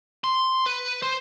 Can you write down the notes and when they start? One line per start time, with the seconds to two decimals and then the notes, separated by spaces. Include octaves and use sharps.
0.24 C6
0.66 B4
1.02 C5